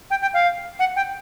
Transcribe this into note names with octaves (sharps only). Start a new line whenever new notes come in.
G5
G5
F5
F#5
G5